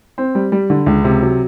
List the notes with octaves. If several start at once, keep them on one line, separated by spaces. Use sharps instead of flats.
C4
G3
G3
D3
C#2
C3
F#3